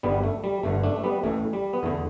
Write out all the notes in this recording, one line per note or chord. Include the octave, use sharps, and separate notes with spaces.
G1 G2 D3 G3 B3
A3
G3
G1 G2 D3 A3
A3 D4
A3
G3 B3
A1 A2 E3 A3
G3
B3
E2 D3 A3